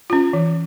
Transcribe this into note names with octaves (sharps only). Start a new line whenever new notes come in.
C#4 F4
E3